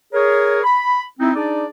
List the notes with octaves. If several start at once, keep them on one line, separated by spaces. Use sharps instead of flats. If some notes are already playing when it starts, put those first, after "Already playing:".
G#4 A#4 C#5
B5
C4 D#4 E4
D4 D#4 G#4 D5